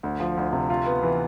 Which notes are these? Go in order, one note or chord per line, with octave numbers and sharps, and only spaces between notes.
D2
F3
D2
C3
F4
B3
E3